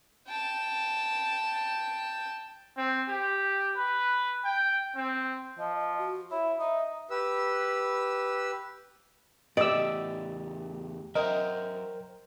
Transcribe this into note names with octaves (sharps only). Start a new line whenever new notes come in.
G5 A5
C4
G4
B4
G5
C4
F3 D#5
D#5
F#4
E4 C#5
D#4 E5
G4 B4 E6
E2 A3 G4 D5 D#5 E6
F#3 A#4 C5 D#5 E5 G5